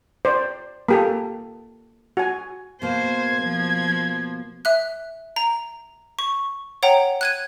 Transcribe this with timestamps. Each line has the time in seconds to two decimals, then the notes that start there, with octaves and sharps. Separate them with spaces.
0.25 C5 D5
0.88 A#3 G4 A4
2.17 F#4 G#5
2.82 B2 A#3 C5 G#6
3.43 F3
4.65 E5 F#6
5.36 A#5
6.19 C#6
6.83 C#5 F#5 G5 A#5
7.21 F#6 G#6 D#7